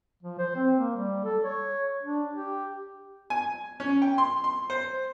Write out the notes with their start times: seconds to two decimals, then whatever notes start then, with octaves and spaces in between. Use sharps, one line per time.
0.23 F3
0.39 C5
0.56 C4
0.78 A#3
0.96 G3
1.25 A4
1.44 C#5
2.03 D4
2.34 G4
3.30 G#5
3.80 C#4
4.02 G5
4.18 C6
4.44 C6
4.70 C5